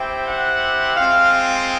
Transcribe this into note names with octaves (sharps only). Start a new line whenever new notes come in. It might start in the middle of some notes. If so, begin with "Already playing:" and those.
Already playing: C4 E4 G4 G5
F#5
G#3 C4 F4 F5